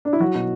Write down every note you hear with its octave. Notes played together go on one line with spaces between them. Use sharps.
D4
E4
F#3 F#4
B2